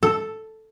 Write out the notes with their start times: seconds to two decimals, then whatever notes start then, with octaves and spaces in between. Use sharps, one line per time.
0.03 A4